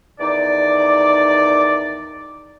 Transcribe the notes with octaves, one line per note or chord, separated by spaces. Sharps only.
E2 D#3 D#4 D5